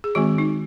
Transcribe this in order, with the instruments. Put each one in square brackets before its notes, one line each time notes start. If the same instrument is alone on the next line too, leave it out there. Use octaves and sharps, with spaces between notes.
[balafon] G#4
D#3 G#3 C4 F#4
D#4